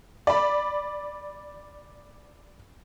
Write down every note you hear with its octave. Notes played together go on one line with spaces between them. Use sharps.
D5 B5